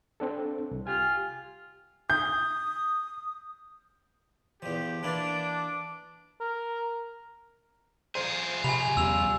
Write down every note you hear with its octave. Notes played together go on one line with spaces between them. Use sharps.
C4 D4 A4
C2
F4 G4 G#5
D#6 G6
E2 F3 G4
E3 A#3 D4 E4 D6
A#4
F3 G#4 C5
C3 G#5 B5 F7
D#1 E2 E6 F7